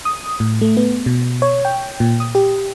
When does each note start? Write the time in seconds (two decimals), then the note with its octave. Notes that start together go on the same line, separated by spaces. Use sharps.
0.05 D#6
0.40 A2
0.61 A3
0.77 B3
1.06 B2
1.42 C#5
1.65 G5
2.00 A#2
2.20 D#6
2.35 G4